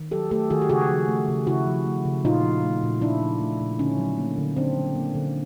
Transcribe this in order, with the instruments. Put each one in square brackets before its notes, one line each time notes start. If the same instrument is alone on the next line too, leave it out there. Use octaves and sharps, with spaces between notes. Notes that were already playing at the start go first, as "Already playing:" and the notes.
Already playing: [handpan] D#3
F#3 G4 A4
A3 G4 A4
D#3 F#4 G#4
G4
C#3 F#4 G#4
F3
A3
C#3
C#3 E4 F#4
F3
A3
C#3
A#2 D#4 F4
F3
A3
A#2
A#2 D4 E4
F3
A3
A#2
D3 C#4 D#4
F#3
A#3
D3
D3 C4 D4
F#3
A#3
D3